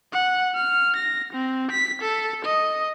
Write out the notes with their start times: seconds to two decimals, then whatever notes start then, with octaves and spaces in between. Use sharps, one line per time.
0.12 F#5
0.55 F6
0.96 A#6
1.34 C4
1.71 B6
2.02 A4
2.45 D#5